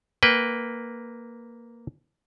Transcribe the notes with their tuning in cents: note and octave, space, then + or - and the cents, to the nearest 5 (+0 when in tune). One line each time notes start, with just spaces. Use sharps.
A#3 -5 B4 +0 G5 +0